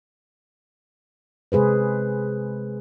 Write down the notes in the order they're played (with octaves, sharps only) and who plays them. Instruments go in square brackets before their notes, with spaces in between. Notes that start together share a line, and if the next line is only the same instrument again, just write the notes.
[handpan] C3 G#3 G#4 B4 C5